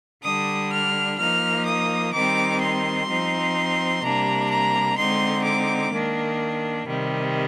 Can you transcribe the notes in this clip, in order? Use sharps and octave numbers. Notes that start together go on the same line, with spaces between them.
D3 G3 D4 D#6
F6
F3 A#3 D#4 F6
D#6
D#3 G3 C4 D#4 D6
C6
F3 C4 D#4
C3 G3 A#3 D4 A#5
A#5
D3 G#3 C4 D#4 C6
D6
D#3 A#3 D4
C3 D#3 G3